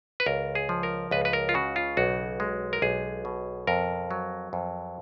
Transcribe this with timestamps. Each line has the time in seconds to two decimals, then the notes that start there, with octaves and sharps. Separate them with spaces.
0.20 B4
0.26 C#2 A#4
0.55 G#4
0.69 F3
0.83 A#4
1.11 C#2 B4
1.25 B4
1.33 A#4
1.49 F4
1.54 C#3 F#4
1.76 F4
1.97 B1 F#4
2.40 G#3
2.73 A#4
2.82 B1 G#4
3.25 B2
3.67 F2 A#4
4.11 F#3
4.53 F2